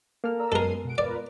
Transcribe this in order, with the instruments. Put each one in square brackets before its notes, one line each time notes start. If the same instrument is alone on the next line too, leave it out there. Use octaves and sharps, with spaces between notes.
[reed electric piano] A#3 A4 F6
[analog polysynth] D5 A#5 E6
[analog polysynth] F#2 C7 D#7 [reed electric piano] G#3 B3 [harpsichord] A4 A#4
[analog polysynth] B2 F#5 D7
[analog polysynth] F4 A#4 B4 [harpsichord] D5